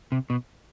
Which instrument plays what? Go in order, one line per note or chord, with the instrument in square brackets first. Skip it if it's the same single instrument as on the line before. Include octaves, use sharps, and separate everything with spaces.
[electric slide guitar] C3
B2